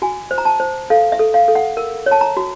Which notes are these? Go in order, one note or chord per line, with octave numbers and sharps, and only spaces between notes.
F#4 G#5
C5
A#5
A5
C5
A4 F5
E5
A4
F5
A4
F#5
A#4
C#5
A5
A#5
F#4